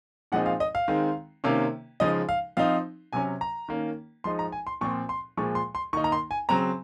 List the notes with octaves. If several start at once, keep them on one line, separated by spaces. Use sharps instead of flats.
A#2 F3 G#3 C4 D#4 F#5
F5
D#5
F5
D#3 G#3 C4
C3 D#3 A#3 C#4
C#3 F3 G#3 D#4 D#5
F5
F3 C4 D#4 F5
C3 F#3 C#4 G#5
A#5
D#3 A#3 C#4
F3 G#3 D#4 C6
A#5
G#5
C6
A#2 F3 C4 C#6
C6
A#2 F3 G#3 C#6
C6
C6
D#3 A#3 D#4 C#6
A#5
C6
G#5
C#3 F#3 C4 A#5